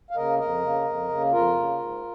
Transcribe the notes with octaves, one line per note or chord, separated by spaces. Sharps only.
F5
C#3 A#3 A#4 D#5
F2 A#4 D#5
C#3 A#3
F2
C#3 A#3
F2 F4 A#4
C#3 A#3
G#2